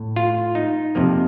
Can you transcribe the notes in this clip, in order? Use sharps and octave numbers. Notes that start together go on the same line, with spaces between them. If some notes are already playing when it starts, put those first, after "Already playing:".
Already playing: A2
F4
D#4
F2 C3 F3 A#3